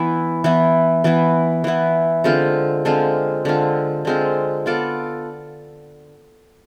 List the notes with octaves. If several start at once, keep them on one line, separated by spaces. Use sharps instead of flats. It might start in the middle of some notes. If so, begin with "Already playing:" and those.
Already playing: E3 B3 E4
E3 B3 E4
E3 B3 E4
E3 B3 E4
D3 G#3 C4 F4
D3 G#3 C4 F4
D3 G#3 C4 F4
D3 G#3 C4 F4
B3 F4 A4 D5